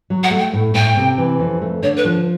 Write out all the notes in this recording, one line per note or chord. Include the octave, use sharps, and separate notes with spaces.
F#3
F#5
A3
G5
A2
A2 G5
C3
E3
F2
A3
D3 C#5
B4
F3